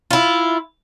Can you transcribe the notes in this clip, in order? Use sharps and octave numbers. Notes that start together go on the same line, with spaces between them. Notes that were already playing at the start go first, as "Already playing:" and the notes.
E4 F4